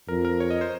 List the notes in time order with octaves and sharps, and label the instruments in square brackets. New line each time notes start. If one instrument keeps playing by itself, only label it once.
[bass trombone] F2 [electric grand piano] A#4
[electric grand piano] A#4
C#5
D#5
C5